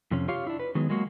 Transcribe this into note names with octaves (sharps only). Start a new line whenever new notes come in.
F2 C3 C#4
F4 G4 C#5 F5
D4 E4
B4
D#3 F#3 G#3 B3
F#3 G#3 A#3 F#4